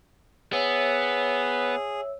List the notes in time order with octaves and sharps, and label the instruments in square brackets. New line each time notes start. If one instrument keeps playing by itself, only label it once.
[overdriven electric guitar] B3 [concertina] G#4 [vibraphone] C#5 E5 E6